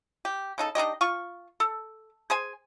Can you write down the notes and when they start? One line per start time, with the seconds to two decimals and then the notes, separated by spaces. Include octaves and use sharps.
0.25 G4
0.58 C#3 D#4 A4
0.75 D4 D#4 G4 D#5
1.01 F4 C#6
1.60 A4
2.30 G#4 C5 G#5